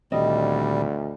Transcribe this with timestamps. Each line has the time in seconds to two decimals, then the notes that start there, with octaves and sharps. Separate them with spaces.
0.12 D2 A#2 D#3 G3 C4 D#5